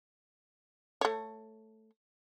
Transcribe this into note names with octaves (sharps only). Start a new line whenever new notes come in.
A3 C#5